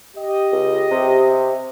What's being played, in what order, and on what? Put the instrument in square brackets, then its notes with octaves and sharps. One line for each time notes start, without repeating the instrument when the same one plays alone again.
[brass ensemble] G4 D#5
[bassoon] C#2
C3